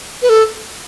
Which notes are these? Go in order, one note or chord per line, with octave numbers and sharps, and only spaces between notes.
B4
A4